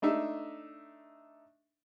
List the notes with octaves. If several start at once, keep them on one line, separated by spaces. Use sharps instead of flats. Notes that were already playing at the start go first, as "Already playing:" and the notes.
A3 D4 D#4 E5